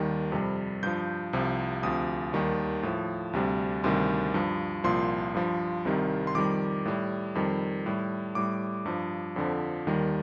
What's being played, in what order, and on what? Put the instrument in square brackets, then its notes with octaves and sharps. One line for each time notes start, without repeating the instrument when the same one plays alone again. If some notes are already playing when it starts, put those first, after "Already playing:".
Already playing: [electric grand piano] D#2 D#3 G3
F2 C3 G3
G2 F3 G6
C2 C3 F3
D2 C3 F3 D#6
D#2 D#3 G3
A2 F3
D2 C3 G3
D2 C3 D#3 G3 C6
G2 F3
C2 A#2 F3 C6
G2 F3
C2 C3 D#3 G3
C6
F2 D#3 G3 D6
A2 G3
F2 D#3 G3
A2 G3
A2 G3 D6
G2 F3
F2 D3 F3
D#2 D#3 G3